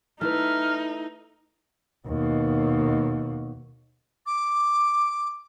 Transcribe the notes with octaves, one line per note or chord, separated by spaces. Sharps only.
A3 D#4 E4 B4 F6
D#2 B2
D6